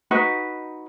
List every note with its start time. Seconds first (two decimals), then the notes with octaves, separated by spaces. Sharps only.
0.11 D#4 F#4 B4